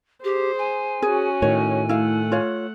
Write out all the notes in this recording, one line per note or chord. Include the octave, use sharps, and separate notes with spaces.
G4 G#4 C5
G#5
C#4 F#4 G#4
A2 D#3 C#5
A3 E4 F5 F#5
F4 C#5 F5